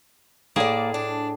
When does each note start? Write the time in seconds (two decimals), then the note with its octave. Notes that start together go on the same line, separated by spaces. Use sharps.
0.56 A2 A#3 G#4 D5 A5
0.94 D4